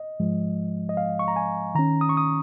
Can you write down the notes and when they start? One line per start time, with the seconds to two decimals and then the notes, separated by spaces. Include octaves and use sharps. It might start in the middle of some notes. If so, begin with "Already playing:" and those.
Already playing: D#5
0.20 G#2 F3 G#3
0.89 D#5
0.97 F5
1.19 C#6
1.28 A#5
1.36 G#5
1.75 D#3 C#4 A#5
2.01 D#6
2.09 C#6
2.17 D#6